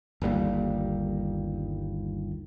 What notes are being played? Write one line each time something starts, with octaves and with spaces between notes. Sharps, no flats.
G1 D#2 G3 A#3